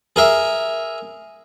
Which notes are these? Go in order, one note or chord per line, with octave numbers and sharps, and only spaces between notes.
G#4 A#4 E5